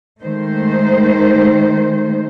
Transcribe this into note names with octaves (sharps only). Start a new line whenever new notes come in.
D#3 G#3 A3 C5